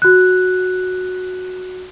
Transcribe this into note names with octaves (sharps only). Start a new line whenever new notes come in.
F#4 F#6